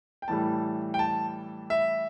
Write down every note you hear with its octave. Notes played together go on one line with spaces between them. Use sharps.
G5
A2 E3 G3 A5
G5
A5
E5